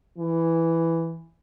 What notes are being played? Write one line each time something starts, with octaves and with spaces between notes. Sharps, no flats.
E3